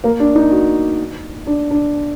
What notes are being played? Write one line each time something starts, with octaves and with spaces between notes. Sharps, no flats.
A#3
D4
D#4
F#4
D4
D4